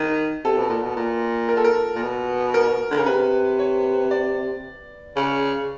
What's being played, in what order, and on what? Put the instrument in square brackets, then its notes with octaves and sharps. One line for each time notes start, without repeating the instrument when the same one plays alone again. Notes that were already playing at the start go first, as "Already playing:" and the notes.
Already playing: [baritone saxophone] D#3
[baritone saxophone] C3 [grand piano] A4
[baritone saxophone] B2
A#2
B2
A#2
[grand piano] A#4
A4
A#4
[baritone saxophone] A#2
B2
[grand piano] A#4
[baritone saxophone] D3
[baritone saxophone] C#3 [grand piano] A#4
[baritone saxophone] C3 [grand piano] B4
[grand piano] C#5
D5
[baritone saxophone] C#3